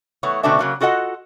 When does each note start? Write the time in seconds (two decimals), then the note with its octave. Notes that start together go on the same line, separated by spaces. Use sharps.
0.23 E3 A3 B3 C#5
0.43 B2 D3 A3 C4 D4 E5
0.59 C#3 F#3 A#3
0.81 F4 F#4 A4 D#5 F#5